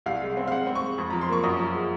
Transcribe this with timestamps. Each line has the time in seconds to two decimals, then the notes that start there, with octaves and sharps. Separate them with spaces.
0.06 C2 F5
0.22 G#3
0.37 C4
0.48 F5
0.51 G#2 F#5
0.67 C4
0.75 C#6
0.83 G#2
0.98 F2
1.10 F3 A#5
1.21 C6
1.29 A#3 C#6
1.44 F#2 D#6
1.59 F3
1.74 G#3